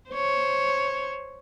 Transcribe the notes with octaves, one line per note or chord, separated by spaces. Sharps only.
C5 C#5